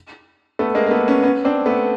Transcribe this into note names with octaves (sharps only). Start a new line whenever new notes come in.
A3 B3
G#3 A#3
A#3
A3 B3
B3 C#4
B3 C#4
C4 D4
A3 B3